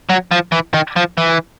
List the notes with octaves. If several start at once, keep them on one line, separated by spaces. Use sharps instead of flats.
F#3
F3
E3
D#3
F3
E3